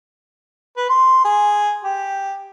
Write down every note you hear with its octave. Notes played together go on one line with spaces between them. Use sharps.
B4
C6
G#4
G4